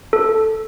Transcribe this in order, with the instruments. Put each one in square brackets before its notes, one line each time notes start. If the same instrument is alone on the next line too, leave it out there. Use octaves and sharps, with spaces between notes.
[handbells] A4